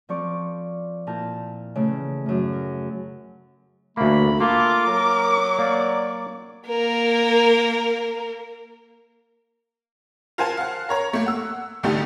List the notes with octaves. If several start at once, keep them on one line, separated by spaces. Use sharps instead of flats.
F3 C4 A4 D5 C#6
A#2 E4 A#4 A5 G6
C#3 E3 A3
F#2 A2
A#4
D2 A3 A#3 B5
A#3 F4 A4 D6
F#3 A#4
A#3 D5
A#3 A#4
F4 A#4 C5 F#5 G#5 A5
F5 F#5
A#4 C#5 A#5
A3 A#3
F#5 E6
C2 D3 A3 D#4 G4 A4